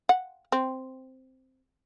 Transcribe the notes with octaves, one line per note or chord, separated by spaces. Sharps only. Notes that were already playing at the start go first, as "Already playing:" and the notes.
F#5
C4